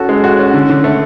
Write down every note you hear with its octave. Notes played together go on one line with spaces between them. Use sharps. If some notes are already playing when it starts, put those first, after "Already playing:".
Already playing: C#4 F#4 A4
G#3
F#4
C#4
D3
D3
A3